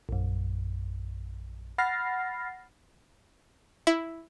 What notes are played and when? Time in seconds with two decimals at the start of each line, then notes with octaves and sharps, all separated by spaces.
0.09 A#1 F#2
1.78 F#5 B5 F6 A6 A#6 C7
3.87 E4